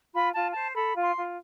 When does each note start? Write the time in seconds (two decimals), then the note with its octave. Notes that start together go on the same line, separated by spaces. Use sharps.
0.13 F4 B5
0.34 F4 A5
0.54 C5 A5
0.74 A4 B5
0.96 F4
1.02 C6
1.16 F4